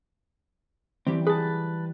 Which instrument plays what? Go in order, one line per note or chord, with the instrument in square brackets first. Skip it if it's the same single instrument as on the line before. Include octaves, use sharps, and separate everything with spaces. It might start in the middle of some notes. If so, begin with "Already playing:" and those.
[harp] E3 G3 G4 [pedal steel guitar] C4
[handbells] G#4 [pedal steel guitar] B4 A5